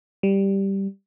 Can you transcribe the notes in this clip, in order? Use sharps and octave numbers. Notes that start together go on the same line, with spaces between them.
G3